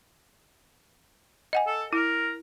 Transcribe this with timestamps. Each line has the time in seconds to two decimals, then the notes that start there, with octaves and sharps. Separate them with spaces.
1.53 D#5 F#5 G#5
1.67 A4
1.93 E4 A#4